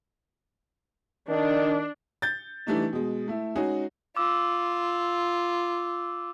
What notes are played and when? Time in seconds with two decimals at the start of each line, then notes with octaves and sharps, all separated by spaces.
1.29 D#3 D4
2.22 G6 A6
2.67 E3 G3 A3 D4 D#4
2.93 B2 G#3
3.28 A3 E4
3.56 G#3 C#4 D#4 F#4 G#4
4.17 F4 D6 E6